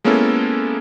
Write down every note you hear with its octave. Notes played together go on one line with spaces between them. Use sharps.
G#3 A#3 B3 C#4 E4 A4